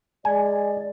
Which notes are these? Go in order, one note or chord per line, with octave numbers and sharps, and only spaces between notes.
G#3 D5 G#5